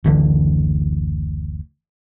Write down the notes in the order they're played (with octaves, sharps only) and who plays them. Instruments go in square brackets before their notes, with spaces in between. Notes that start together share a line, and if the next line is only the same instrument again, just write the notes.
[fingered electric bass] F#1 D2 D3 E3